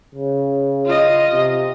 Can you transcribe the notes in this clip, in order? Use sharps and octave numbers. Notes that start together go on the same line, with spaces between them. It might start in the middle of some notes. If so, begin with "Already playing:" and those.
C#3
F4 D#5
C3